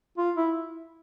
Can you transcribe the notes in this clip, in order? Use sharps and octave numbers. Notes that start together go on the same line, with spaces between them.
F4
E4